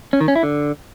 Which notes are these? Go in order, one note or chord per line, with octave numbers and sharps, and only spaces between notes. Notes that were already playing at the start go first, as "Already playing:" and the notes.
C#4
D#3
C#4
E4
D3